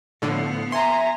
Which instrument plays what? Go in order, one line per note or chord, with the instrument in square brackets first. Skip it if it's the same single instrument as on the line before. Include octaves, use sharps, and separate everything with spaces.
[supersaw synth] A2 D3 [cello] F3 B3
[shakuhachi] E5 [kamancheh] G#5 A#5 [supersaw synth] C6